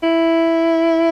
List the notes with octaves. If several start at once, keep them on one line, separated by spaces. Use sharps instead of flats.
E4